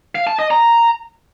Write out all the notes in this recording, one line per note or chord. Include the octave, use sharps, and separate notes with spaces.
F5
A5
D#5
A#5